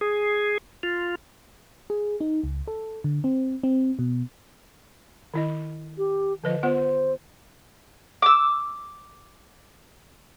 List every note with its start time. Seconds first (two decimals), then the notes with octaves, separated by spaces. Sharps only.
0.01 G#4
0.83 F4
1.90 G#4
2.21 D#4
2.44 C#2
2.68 A4
3.04 D3
3.24 C4
3.63 C4
3.99 B2
5.34 D#3 E4 D#5
5.98 G4
6.44 D3 F3 B4 D#5
6.63 B3 F4 C5 F#5
8.22 D6 E6